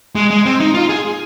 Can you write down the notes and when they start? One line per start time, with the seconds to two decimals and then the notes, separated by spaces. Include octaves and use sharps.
0.15 G#3
0.30 G#3
0.46 C4
0.60 D#4
0.75 F4
0.89 G#4